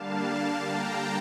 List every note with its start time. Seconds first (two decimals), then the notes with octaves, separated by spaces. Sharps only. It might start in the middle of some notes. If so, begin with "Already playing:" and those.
Already playing: D3 G3 A#3 D4 F5 A5
0.26 F5 A5
0.65 G5 A#5